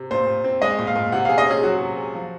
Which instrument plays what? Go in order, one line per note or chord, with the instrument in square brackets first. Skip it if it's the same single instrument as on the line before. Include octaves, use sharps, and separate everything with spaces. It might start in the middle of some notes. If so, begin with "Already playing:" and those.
Already playing: [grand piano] C3
[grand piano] A#2 [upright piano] C5
[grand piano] A#2
C4
[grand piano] G#3 [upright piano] D#5
[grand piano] A#2
[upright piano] F5
[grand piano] A#2
[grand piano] C3 [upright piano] F#5
[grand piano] G#4 [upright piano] F5
[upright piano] D#5
[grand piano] C#4 [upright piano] G#4
[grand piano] F#3 [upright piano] F#4
[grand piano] C3
G#4
F3